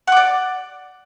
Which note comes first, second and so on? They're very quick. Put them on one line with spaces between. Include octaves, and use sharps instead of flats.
F#5 D6 D5